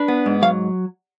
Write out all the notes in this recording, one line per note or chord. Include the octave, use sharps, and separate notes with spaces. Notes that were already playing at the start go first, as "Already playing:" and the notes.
Already playing: D4 B4
B3
G#2
F#3 F5